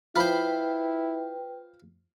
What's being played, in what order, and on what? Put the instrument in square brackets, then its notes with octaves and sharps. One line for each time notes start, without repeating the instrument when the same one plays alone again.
[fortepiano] F3 B5 [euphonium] E4 [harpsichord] F4 C5 [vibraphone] B4 G5